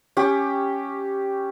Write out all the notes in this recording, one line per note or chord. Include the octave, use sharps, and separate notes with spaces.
C#4 G4